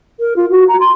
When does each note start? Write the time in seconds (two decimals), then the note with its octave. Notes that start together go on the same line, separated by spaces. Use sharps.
0.20 A#4
0.36 F4
0.51 F#4
0.68 A#5
0.80 C6